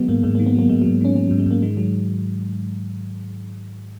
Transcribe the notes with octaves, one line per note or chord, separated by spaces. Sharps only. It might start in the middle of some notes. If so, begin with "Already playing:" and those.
Already playing: D#3 F#3 G#3 B3
G#2 A#3
G#2 G#3
A#3
D#3
B3
F#3 A#3
G#2 G#3
F#3
G#2
D#3 C#4
F#3 C#4
F#3
G#2
G#3
G#2 A#3
D#3 G#3
F#3